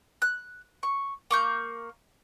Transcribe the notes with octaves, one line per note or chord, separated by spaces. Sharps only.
F#6
C#6
A#3 C#6 G6